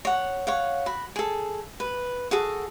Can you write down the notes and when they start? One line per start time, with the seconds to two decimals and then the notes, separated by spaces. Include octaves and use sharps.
0.05 C#5 F#5
0.47 C#5 F5 F#5
0.86 F#4 B5
1.16 G#4 A4
1.80 B4
2.31 F#4 G#4 A4